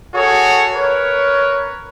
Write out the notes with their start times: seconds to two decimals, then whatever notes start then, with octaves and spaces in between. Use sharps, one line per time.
0.14 F#4 G#4 A4 C#5
0.74 A#4 B4 C#5